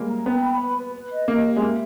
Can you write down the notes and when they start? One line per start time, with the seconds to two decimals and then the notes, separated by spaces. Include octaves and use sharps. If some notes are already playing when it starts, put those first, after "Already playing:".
Already playing: G3 G#3 A#3
0.09 A#5
0.26 B3 G5
0.43 B5
0.59 B4
0.77 B4
0.94 B4
1.11 D#5
1.28 A#3 G4
1.45 G4
1.56 G#3
1.62 A#3 E5